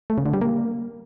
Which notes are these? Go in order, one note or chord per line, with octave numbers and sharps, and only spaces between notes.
A3
C#3
D3
G3
A#3